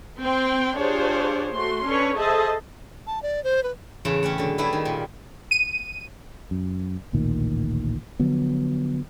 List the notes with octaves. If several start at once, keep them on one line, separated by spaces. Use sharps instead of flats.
C4 G5 C6
D4 F4 G4 G#4 C5 C#5
A3 F#4 C6
C#4 D4 A4 B4 C#5
G#4 A4 C5 D#5 E5 A5
A5
D5
C5
B4
E2 A2 C#3 A3
C#4 G4 C#5 F#5
D3 F#3
G3 A3 E4 G#4 B4
D#3
A#2
D#7
F#2
A1 D2 A#2 D#3
D3 F3 F#3 B3